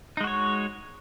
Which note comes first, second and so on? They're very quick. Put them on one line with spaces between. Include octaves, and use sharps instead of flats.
D#4 G#3 F#4 C#5